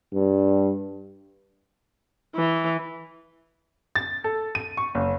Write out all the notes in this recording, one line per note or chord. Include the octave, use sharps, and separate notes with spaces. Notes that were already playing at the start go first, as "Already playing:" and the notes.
G2
E3
A6
A4
D#7
C#6
F#1